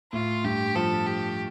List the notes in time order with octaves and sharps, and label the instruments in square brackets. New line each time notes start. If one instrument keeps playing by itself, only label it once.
[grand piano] A2 [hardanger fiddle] F4
[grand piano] G2 [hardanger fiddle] G4
[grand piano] F3 [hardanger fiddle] A4
[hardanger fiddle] G4